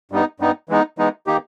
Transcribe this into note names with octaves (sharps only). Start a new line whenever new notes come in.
G2 G3 B3 D#4
G2 G3 B3 D#4
E3 G#3 B3 D#4
E3 G#3 B3 D#4
D#3 A#3 D#4 G4